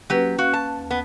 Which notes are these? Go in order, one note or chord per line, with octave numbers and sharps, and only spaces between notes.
F#3 A#3 C#4 G4 B4
C#4 F#4 F5
A5
D#2
B3